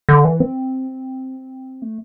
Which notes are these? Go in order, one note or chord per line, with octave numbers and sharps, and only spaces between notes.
D3
E3
C4
A3